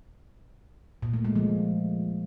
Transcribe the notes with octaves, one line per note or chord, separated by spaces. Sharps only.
A#2
A3
G#3
F3